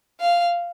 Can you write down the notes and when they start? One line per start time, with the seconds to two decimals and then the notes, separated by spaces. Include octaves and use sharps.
0.20 F5